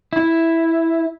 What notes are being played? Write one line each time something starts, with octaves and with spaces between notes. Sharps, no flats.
E4